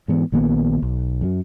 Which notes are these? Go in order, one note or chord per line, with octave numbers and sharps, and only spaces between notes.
G#2 E3 B3
A#1 D#3 A#3 B3
B1
F#2 F#3